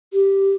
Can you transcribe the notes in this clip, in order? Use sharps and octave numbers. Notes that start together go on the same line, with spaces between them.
G4